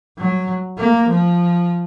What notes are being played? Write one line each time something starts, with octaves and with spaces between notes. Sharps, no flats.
F#3
A#3
F3